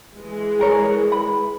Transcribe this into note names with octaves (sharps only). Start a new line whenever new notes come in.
E3 G#3
G#4 A#4 C#5
B5